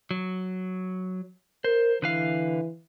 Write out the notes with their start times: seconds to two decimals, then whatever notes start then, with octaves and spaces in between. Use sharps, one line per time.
0.11 F#3
1.64 A#4 C5
2.02 D3 E3 B4 F5